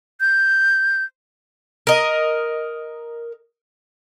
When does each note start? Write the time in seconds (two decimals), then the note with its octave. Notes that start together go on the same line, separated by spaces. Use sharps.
0.20 G6
1.87 A#4 D#5